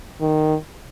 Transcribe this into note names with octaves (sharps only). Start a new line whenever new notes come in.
D#3